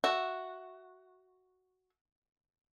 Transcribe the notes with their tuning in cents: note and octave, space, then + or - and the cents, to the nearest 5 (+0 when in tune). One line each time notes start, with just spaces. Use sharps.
F#4 +0 E5 +0